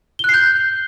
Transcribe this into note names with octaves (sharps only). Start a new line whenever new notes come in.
F#6 G6 C7 G7